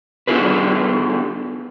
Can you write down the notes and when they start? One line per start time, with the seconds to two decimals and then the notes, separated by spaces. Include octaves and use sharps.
0.27 B3 D4 F4 G4 G#4 B4